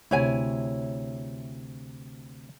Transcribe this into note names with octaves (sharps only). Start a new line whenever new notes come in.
D2 C3 E4 C#5 G#5